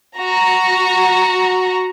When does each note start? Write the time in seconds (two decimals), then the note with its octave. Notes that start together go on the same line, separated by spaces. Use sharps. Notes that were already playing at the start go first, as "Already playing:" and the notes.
0.17 F#4 A#5